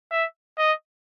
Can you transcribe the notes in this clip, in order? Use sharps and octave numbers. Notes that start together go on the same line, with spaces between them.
E5
D#5